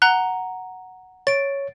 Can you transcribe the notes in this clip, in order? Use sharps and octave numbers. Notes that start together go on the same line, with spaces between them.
F#5 A#5 F#6 G7
C#5 A6 D7